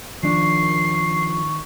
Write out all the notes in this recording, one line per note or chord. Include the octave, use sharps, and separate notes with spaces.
D#3 F3 D4 C#6 C7